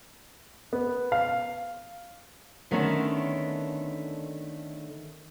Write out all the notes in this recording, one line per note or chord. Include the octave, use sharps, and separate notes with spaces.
B3
F5
D3 D#3 A3 B3 C#4